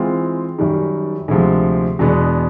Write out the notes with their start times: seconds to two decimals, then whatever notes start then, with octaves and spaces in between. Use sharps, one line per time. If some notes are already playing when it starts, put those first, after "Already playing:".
Already playing: E3 G#3 C4 F4
0.58 F#2 D#3 G3
1.28 D2 C3 F3 G#3
1.99 E2 B2 G#3 B3 D4